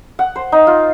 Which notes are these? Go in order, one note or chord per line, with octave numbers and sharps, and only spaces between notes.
F#5
C5
D#4
F4